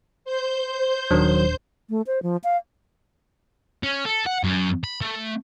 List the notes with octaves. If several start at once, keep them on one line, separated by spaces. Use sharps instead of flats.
C5 G6
D#1 D#3 F#3 D4
A3
C5
F3
F5
C#4
A4
F#5
F#2
B5
A3